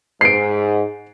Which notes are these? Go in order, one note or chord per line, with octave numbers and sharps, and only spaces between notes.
G#2 C7 D7